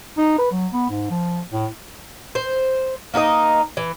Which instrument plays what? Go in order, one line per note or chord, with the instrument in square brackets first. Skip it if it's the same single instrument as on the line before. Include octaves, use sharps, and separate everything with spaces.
[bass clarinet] D#4
B4
F#3
B3
G#2
F3
A2
[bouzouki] C5
A#3 D#4 F#4 D#5
E3